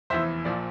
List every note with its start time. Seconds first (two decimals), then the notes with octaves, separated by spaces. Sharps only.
0.10 F1 E2 E3 C5 E5
0.45 A#1 A#2 F3 D5